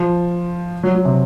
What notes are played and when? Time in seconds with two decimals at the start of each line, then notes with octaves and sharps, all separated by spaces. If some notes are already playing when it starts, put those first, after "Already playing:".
Already playing: F3
0.83 F#3
0.95 F#3
1.05 C3